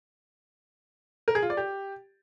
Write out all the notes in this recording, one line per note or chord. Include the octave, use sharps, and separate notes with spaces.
A#4
G#4
F4
D5
G4